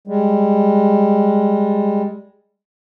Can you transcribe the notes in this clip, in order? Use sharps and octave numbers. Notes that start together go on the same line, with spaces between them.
G3 G#3